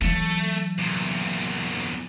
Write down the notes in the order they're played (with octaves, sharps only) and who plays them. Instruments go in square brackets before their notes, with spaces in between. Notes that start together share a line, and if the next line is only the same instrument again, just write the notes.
[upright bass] E3 F#3 [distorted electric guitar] A3
[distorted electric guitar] E2 A#2